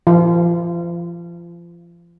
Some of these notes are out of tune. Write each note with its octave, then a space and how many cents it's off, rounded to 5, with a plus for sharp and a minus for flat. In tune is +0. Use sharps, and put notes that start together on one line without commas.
F3 -35 F4 -25